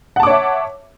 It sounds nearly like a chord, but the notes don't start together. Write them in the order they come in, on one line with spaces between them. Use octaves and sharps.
F#5 A5 D6 C#5 E5